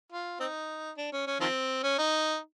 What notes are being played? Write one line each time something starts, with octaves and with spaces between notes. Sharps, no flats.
F4
C4 D#4
D4
C#4
C#4
D#3 F3 C4
C#4
D#4